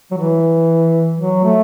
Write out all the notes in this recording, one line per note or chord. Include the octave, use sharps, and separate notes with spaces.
F#3
E3
F#3
A3